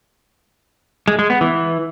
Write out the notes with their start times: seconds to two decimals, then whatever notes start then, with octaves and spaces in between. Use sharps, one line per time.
1.08 G#3
1.19 G#3
1.30 B3
1.41 E3